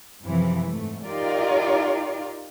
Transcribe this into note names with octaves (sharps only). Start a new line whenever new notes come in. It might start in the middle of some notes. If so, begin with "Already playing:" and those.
F#2 C3 E3 F3
G#2 A3
D#4 F4 G4 A#4 D5